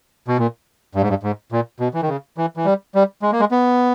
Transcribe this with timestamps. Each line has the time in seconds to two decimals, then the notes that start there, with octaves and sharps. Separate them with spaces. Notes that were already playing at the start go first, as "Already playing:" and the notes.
0.28 B2
0.38 A#2
0.95 G2
1.02 G#2
1.10 G2
1.23 G#2
1.52 A#2
1.80 B2
1.94 E3
2.02 D#3
2.08 C#3
2.37 E3
2.57 E3
2.65 G3
2.95 G3
3.22 G#3
3.32 A#3
3.40 G#3
3.51 B3